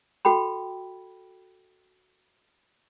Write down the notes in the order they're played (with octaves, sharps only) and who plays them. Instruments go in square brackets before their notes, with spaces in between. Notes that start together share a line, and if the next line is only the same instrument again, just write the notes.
[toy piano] F#4 A4 G5 B5